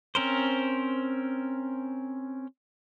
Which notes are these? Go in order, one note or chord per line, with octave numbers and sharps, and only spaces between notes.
C4 C#4 A#4 C5